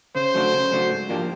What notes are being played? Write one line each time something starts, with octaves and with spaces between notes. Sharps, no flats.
C#3 C5
F#3 A3 D4 F#4
C#3
F#3 A3 D4 F#4
G#2
F3 A#3 D4 G4